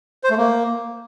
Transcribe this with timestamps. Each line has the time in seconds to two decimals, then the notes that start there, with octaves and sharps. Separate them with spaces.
0.24 C5
0.31 A3
0.37 A#3